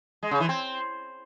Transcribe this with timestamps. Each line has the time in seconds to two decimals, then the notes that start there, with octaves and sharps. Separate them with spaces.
0.23 G#3
0.31 C#3
0.40 E3
0.49 C4